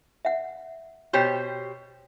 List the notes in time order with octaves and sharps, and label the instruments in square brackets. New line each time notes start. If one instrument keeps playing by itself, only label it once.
[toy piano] E5 F#5
[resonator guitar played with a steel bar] B2 G4 C5 [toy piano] C#5 G5